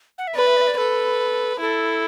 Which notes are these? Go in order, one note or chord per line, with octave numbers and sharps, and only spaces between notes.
F#5
E5
B4 D5
E5
D5
E5
D5
A4 B4
E4 A4